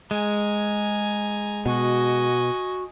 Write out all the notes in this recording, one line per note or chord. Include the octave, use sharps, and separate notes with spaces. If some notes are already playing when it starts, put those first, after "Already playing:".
G#3 G#5 A#5
B2 F#4 D#5 G#5